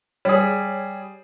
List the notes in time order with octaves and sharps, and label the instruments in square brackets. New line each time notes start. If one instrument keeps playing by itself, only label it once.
[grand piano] G3 G#4 [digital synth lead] C#5